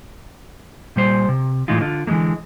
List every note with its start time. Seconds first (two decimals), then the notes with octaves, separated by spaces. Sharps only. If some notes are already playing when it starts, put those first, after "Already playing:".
0.96 A#2 G3 C5
1.29 C3
1.68 A2 E3 G#3 D#4 F4
1.81 D3 F4
2.07 D3 E3 F3 G#3 A#3